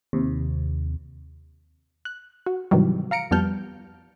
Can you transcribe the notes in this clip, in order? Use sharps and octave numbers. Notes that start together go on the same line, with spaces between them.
D#2 C3
F#6
F#4
G#2 C3 D#3 E3 F#3 G3
F5 A#5 C#7 D7
F2 G3 B3 A5 F6 G6